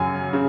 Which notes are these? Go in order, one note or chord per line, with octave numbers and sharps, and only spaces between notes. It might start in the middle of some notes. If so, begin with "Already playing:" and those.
Already playing: F#2 C#3 F#3 G#5
C#3